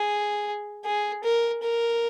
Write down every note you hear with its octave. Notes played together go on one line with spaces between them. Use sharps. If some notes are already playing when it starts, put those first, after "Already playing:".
Already playing: G#4
G#4
A#4
A#4